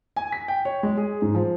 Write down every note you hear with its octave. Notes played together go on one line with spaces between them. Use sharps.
G#5
B6
G5
C#5
G#3
G#4
G#2
F3